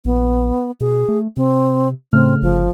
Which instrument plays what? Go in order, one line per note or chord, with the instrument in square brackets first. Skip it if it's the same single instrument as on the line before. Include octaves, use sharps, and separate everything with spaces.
[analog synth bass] A#1 [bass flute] B3
[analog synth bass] B2 [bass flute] G#4
[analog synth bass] A3
[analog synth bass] C3 [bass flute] C4
[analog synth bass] A2 [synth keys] C#3 A3 F6 [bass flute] C4
[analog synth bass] G1 [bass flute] F3